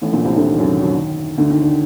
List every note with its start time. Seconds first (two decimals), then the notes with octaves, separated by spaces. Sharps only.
0.02 A1 A2
0.13 A#1 A#2
0.25 C2 C3
0.36 D2 D3
0.47 D#2 D#3
0.59 F#2 F#3
0.81 F#2 F#3
0.93 D#2 D#3
1.38 D2 D3
1.50 D#2 D#3
1.61 D3